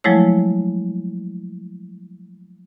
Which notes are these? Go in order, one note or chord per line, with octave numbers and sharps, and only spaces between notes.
F3 F#3 G#3 A3 E4 C#5